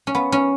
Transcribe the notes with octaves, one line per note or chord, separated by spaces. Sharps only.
C#4
B3
C#4